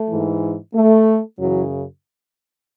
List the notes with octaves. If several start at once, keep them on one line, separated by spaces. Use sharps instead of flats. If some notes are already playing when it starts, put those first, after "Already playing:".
Already playing: A3
G#2 E3
A3
F#2 C#3 E3 F#3